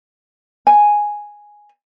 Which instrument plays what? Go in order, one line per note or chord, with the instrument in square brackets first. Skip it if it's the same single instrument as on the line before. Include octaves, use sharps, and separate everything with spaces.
[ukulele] G#5